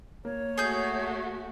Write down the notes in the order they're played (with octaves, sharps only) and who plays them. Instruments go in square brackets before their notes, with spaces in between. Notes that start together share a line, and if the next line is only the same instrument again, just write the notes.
[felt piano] A#3 [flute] C#5
[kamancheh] A3 F#4 [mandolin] G#4 G6